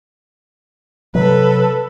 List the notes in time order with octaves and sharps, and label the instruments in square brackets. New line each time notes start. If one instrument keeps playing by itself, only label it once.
[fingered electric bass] C3 F#3 [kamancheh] A4 B4